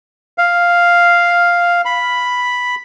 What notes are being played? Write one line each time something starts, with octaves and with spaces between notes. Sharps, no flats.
F5
B5